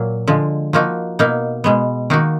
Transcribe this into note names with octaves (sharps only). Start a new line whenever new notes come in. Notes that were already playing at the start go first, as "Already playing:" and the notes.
Already playing: A#2 F#3 A#3
D3 F3 G#3
F3 A#3 D#4 F#4
B2 A#3 D#4
B2 G#3 B3
D#3 A#3 D#4 F#4